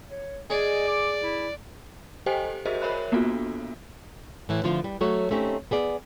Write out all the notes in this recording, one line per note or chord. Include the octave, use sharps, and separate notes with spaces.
C#5
G#4 D5 D#5
D6
E4
G4 A4 C5 D#5 G5 G#5
F#4 G#4 A#4 C5 D#5 E5
A#4 C#5 E5 B5 F#6
A#3 B3 D4 F4 F#4 A4
A2 E3
D3 F3 A3 F4
G3
F#3 A3 F#4 C#5
A3 C4 C#4 D#4 G4
B3 G#4 D5